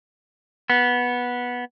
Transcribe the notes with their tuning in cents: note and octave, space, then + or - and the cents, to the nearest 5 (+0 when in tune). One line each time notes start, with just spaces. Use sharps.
B3 -10